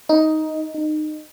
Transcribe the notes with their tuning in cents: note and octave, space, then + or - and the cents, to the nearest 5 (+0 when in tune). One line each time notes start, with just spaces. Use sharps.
D#4 +10
D#4 -25